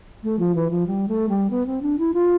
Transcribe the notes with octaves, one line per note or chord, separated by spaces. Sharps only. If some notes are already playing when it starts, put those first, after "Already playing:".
A3
F3
E3
F3
G3
A3
G3
B3
C4
D4
E4
F4